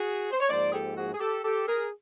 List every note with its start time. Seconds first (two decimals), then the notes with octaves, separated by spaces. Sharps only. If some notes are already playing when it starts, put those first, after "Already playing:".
Already playing: F#4 G#4
0.31 C5
0.40 C#5
0.49 G#2 F3 A#3 C5 D5
0.68 G#4
0.73 G4 A4
0.96 F#4 G#4
1.13 G#4
1.20 G4 A4
1.44 G4 A4
1.68 G#4 A#4